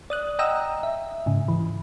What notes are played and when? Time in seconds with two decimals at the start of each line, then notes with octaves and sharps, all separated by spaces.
0.10 D5 D#6 F#6
0.39 D#5 F#5 G5 A#5 D#6 E6
0.83 E5
1.26 G#2 C#3
1.48 E3